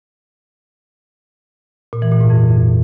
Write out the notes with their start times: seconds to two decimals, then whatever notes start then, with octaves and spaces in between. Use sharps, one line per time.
1.93 A#2
2.02 E3
2.11 A#2
2.21 G#2
2.30 F2